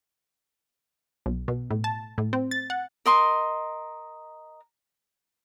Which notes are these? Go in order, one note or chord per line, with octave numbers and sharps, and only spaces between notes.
B1
B2
A2
A5
A2
C4
A6
F#5
A#4 D#5 C6